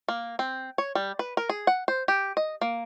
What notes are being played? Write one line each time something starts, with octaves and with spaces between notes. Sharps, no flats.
A#3
C4
C#5
G3
B4
A#4
G#4
F#5
C5
G4
D#5
A#3